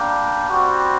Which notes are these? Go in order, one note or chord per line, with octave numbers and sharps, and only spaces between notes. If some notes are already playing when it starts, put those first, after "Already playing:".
Already playing: G3 A#3 D4 G4
G3 C4 F#4